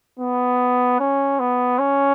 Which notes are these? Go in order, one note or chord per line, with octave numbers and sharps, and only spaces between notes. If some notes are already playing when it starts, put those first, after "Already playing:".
B3
C#4
B3
C#4